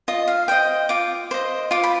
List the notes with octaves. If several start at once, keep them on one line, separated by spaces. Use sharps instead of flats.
F4 D#5
F5
C5 D#5 G5
F4 D6
C5 D#5
F4 D6
B5